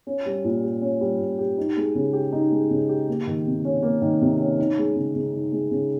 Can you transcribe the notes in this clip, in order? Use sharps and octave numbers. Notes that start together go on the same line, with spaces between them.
C#4
G3
A#2
G4
C#4
G3
A#2
G4
D#4
G#3
C#3
G4
D#4
G#3
C#3
G4
A#3
D#3
C3
C#4
A#3
D#3
C3
C#4
D#4
G#3
C#3
C#3
D#4
G#3
C#3